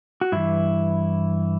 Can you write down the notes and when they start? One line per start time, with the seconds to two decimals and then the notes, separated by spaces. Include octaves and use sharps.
0.21 F#4
0.32 G2 E3 E4